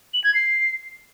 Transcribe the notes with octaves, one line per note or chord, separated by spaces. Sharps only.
F#7
G#6
C7